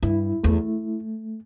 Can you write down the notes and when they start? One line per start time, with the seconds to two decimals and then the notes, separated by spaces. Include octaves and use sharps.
0.03 G2 E4
0.43 E2 A3